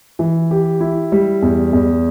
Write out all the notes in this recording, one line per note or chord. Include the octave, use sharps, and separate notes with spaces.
E3
G4
E4
G3
E2
E2